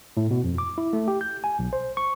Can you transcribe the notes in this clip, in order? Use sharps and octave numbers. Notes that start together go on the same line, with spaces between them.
A2
B2
F2
D6
E4
A3
G4
G6
G#5
B1
C5
C#6